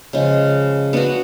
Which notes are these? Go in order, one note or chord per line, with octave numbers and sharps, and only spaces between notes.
C#3 F3 G#3
B3 D4 F#4